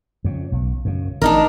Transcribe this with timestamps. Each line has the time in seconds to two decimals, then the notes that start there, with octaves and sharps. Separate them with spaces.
0.24 F2 C#3
0.52 B1
0.85 F#2 C#3
1.22 A1 D#3 D4 D#4 A#4